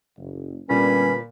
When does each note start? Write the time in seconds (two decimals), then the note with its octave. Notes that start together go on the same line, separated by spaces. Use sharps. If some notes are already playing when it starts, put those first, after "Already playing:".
0.17 F#1
0.70 G1 A#2 G3 C#4 B4 B5